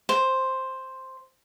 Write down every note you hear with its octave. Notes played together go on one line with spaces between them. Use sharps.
C5